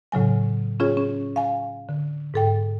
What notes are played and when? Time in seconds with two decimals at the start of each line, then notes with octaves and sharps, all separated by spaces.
0.12 A2 C#3 F#3 G#5
0.80 C#4 F4 G#4 C#5
0.97 C#4
1.36 F5 G#5
1.89 D3
2.34 G#2 A4 G5